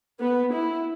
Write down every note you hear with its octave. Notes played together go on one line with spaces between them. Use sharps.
B3
E4